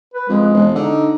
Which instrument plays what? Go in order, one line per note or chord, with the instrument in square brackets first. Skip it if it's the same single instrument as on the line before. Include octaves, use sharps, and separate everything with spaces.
[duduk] B4
[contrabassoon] F2 [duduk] G#3
[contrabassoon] E1
[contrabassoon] D3 [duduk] D#4